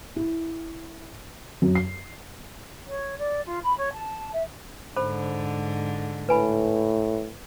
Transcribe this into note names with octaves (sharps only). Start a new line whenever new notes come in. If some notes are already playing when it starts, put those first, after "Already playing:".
E4
F#2
C7
C#5
D5
F4
B5
C#5
A5
E5
G#2 D3 A4 C5 B5
A2 B4 G#5 B5